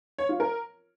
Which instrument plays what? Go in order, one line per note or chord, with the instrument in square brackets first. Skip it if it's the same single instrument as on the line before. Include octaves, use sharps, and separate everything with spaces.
[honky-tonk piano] C#5
F4
A#4